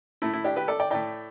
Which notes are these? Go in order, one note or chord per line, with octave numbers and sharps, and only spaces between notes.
A2 A3 E4
E4
D4 G4
G4 B4
A4 D5
D5 G5
A2 A3 D5 G5